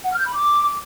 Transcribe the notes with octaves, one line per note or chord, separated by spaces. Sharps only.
F#5
F6
G6
B5
D6